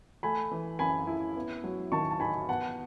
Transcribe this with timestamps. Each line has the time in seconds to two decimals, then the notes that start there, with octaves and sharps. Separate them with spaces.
0.23 A3 G#5 B5
0.51 E3
0.79 F#2 G#5 B5
1.07 E4
1.36 B3
1.64 F#3
1.92 D#3 A5 C#6
2.11 A5
2.20 D#4 G#5 B5
2.49 B3 F#5 A5